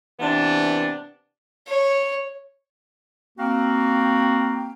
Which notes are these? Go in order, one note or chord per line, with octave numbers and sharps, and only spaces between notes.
C3 E3 B3 D4
C#5
A#3 C4 F#4 F5 G5